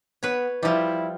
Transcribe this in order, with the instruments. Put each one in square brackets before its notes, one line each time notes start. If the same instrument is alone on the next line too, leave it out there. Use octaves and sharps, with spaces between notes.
[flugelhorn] B3 [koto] B4 C#5
[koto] F3 G3 [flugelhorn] E4